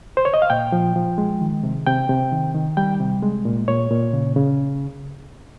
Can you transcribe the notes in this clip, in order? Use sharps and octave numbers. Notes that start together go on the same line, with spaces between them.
C5
C#5
D#5
F5
A#2 G5
F3
F3
G#3
D#3
C3
C3 G5
C3
D#3
D#3
G3 G5
C3
G#3
A#2
A#2 C#5
A#2
C#3
C#3